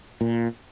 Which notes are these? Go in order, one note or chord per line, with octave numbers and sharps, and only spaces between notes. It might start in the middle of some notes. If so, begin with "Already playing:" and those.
A#2